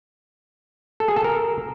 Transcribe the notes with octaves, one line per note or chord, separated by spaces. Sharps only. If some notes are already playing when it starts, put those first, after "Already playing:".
A4
G#4
A4
A#4